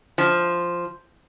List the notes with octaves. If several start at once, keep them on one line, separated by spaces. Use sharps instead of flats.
F3